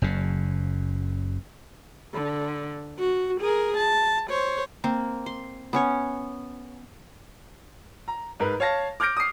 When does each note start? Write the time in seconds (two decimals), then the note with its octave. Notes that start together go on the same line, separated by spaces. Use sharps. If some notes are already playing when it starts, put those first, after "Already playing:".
0.02 F#1 F#2 C#3
2.15 D3
2.99 F#4
3.41 G#4 A#4
3.77 A5
4.30 C5 C#5
4.84 A#3 C4
5.26 C6
5.73 B3 C#4 C#5
8.08 A#5
8.40 G#2 A#4 B4
8.60 C#5 F5 A5 A#6
9.00 D6 F6 G6 A#6 D7
9.17 D#6 C7